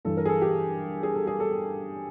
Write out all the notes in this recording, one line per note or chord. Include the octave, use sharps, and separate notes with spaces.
G2 E3 A4
A#4
G#4
A4
G4
G#4
A4
G#4
A4